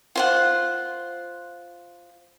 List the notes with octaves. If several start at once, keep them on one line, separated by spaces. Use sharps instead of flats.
F4 C5 F#5